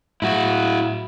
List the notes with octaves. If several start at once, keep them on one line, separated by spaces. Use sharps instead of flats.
A2 F#3 E4 F#4